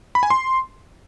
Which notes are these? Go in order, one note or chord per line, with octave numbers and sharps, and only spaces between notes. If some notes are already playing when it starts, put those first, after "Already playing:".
B5
G#5
C6